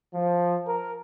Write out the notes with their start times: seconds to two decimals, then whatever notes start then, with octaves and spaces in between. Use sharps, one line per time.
0.15 F3
0.67 A#4